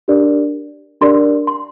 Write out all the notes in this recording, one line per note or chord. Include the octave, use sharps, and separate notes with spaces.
D4 G4 A#4 D5
D4 G4 A#4 D5 C6
C6